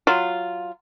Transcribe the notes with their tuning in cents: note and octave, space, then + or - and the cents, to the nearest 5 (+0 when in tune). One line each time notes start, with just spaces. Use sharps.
F#3 +0 F4 +0